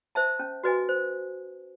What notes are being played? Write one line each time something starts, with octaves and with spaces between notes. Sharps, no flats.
C5 E5 A5
C#4
F#4 B4 D#5 G#5
C5